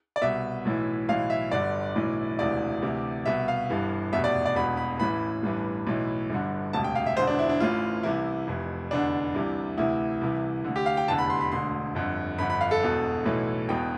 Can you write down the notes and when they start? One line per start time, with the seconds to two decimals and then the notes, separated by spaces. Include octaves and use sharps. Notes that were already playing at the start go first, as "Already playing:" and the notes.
0.16 D5
0.22 C2 B2 E5
0.65 B1 A2 E3
1.09 B1 A2 E3 F5
1.30 E5
1.51 G1 G2 D3 D5
1.96 B1 A2 E3
2.38 E1 D2 C3 E3 D5
2.82 D2 C3 E3
3.26 C2 B2 E5
3.48 F5
3.70 G1 G2 E3
4.12 F1 E2 B2 E5
4.24 D5
4.45 D5
4.56 E1 E2 B2 B5
4.77 B5
4.99 A1 A2 E3 B5
5.43 A1 G2 E3
5.87 B1 A2 E3
6.30 G1 G2 D3
6.73 E1 D2 C3 A5
6.84 G5
6.95 F5
7.06 E5
7.17 E1 E2 D3 C5
7.27 D4
7.39 E4
7.49 D4
7.60 A1 A2 E3 F4
8.03 C2 C3 E3 E4
8.47 F1 F2 E3
8.91 F1 E2 D3 D4
9.34 C2 C3 E3
9.78 D2 C3 E3 E4
10.21 C2 C3 E3
10.64 D2 D3
10.76 G4
10.86 F5
10.97 G5
11.08 F1 E2 D3 A5
11.18 B5
11.30 C6
11.41 B5
11.52 E1 D2 D3 C6
11.95 G1 F2 D3
12.38 G1 F2 D3 B5
12.50 B5
12.61 F5
12.71 A4
12.82 E1 E2 B2
13.26 B1 A2 E3
13.68 E1 E2 B2 G5